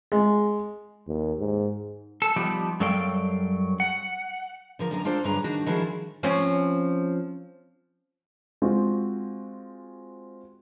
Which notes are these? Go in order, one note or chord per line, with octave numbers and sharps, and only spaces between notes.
G#3
D#2
G#2
A4
F3 G3 B3 D#4 G4
F#2 F#3 G3 A4 F5 G5
F#5
D3 F3 A#4
F#2 D3 A#5
D4 F4 A4 C5 D5
G2 D3 F#3 G#4 A#5
D#3 D4 F#4
D#3 F3 E4 F#4 G#4 A4
F3 C4 C#4
G#3 C4 F4 F#4